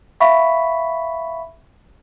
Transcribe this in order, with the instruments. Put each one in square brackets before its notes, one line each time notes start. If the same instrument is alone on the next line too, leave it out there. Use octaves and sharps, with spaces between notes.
[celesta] E5 F5 B5 C#6 B6